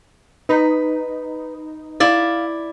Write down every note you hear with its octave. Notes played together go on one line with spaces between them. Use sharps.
D#4 B4
E4 D5 F5